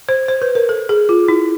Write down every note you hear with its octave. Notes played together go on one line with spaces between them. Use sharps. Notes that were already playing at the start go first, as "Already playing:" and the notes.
C5
C5
B4
A#4
A4
G#4
F4
E4